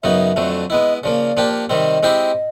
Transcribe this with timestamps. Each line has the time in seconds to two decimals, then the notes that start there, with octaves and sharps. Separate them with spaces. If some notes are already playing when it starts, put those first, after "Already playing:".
0.03 F#2 C#3 F#3 B3 D#4 E5
0.36 F2 D3 F#3 A3
0.70 G#3 B3 E4 D#5
1.03 C#3 F3 A#3 D5
1.37 F3 A#3 D4 G4
1.69 C3 D#3 G3 C4 D#5
2.03 G#3 C4 E4 G4 C5